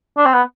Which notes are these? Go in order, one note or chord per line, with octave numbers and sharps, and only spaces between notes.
D4
C4
B3